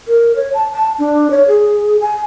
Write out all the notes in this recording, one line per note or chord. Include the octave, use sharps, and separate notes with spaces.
A#4
C#5
A5
A5
D4
C#5
G#4
G#5